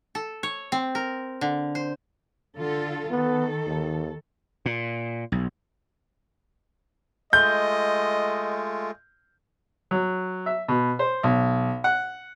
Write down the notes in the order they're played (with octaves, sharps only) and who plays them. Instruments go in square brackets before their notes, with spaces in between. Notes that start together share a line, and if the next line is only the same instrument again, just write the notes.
[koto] A4
C#5
C4
A#4
D3
C5
[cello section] D3 F4 A4
[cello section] D#3 A4 [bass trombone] B3
[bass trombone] D#2
[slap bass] A#2
B1
[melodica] G#3 A3 F4 [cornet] D#5 [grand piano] G6
[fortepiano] F#3
E5
B2
C5
B1
F#5